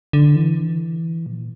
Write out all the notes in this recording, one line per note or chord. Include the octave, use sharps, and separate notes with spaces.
D3
E3
A#2